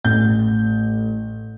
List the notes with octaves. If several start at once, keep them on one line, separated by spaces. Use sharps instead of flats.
A1 G6